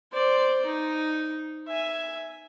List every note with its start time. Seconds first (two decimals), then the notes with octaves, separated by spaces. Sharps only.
0.13 C5 D5
0.66 D#4
1.67 E5 G#5